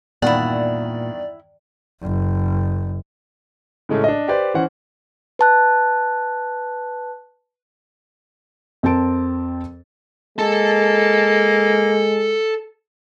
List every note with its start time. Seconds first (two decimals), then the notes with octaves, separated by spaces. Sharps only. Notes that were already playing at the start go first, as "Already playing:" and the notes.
0.22 E2 G2 A#2 D#3 E4 D5 F#5
2.02 F#1
3.89 A2 C#3 G#3 A3 C#4
4.04 D4 D#5
4.28 G4 B4 C5 D5
4.54 E3 C#4 C5 F#5
5.39 B4 A5 F#6
8.83 F2 C4 A#4 A5 D7
10.39 G#3 A#3 A4 A5